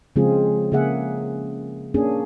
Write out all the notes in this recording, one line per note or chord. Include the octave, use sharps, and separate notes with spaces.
C#3 F3 G#3 C4 F4 G#4
C#3 A#3 G#4 E5 F#5
A#3 C#4 D4 G#4